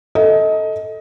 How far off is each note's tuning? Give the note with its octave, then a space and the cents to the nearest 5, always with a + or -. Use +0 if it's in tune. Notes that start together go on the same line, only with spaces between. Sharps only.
A4 +0 D#5 +20